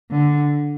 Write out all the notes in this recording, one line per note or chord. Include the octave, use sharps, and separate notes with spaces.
D3